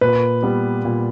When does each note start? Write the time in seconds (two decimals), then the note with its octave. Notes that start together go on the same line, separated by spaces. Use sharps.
0.01 A#2 B4
0.42 G3 B3
0.85 A#2